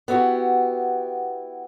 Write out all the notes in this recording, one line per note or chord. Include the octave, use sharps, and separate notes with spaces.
B3 E4 F#4 G4